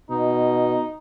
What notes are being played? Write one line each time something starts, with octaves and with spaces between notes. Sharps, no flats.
B2 D#4